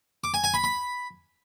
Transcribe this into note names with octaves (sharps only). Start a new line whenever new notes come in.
D6
G#5
G#5
B5
B5